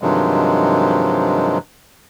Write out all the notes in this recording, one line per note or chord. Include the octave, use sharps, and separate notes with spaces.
G2 C3 D#3 F3 F#3 G#3